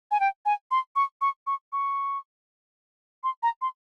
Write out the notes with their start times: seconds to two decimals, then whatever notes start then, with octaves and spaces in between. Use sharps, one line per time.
0.11 G#5
0.20 G5
0.46 G#5
0.71 C6
0.96 C#6
1.21 C#6
1.47 C#6
1.73 C#6
3.24 C6
3.43 A#5
3.62 C6